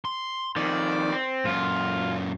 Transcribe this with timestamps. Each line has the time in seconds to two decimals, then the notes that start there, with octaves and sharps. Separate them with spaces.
0.05 C6
0.56 F2 D#3 D5
1.12 C4
1.45 F#2 A#2 F4